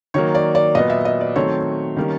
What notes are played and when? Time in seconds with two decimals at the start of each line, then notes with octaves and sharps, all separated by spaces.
0.14 D#3 F#3 A#3 C#5
0.35 D5
0.55 D5
0.75 A#2 F#3 B3 D#5
0.90 E5
1.05 D#5
1.21 D5
1.36 D#3 F#3 A3 C4 C#5
1.96 D#3 G3 A#3 C#4